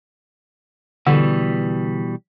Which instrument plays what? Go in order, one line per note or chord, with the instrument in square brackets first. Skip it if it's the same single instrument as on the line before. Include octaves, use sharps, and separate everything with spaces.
[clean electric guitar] B2 E3 G3 [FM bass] D3